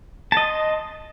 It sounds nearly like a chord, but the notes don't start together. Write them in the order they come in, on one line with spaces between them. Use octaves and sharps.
A5 D#5 C6